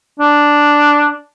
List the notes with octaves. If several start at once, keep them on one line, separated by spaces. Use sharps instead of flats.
D4